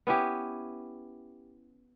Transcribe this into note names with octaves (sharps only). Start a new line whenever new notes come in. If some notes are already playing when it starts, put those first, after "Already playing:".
B3 C#4 E4 G4